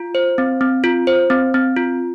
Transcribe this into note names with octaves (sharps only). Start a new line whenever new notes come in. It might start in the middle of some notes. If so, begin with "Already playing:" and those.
Already playing: F4
C5
C4
C4
F4
C5
C4
C4
F4